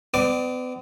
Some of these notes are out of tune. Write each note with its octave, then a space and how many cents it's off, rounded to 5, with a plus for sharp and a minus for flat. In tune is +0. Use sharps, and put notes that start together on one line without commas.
B3 +45 D5 +25 D6 +0